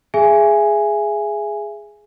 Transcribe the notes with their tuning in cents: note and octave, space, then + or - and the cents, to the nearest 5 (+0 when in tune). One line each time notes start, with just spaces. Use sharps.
G#4 +0 E5 +25 G#5 +0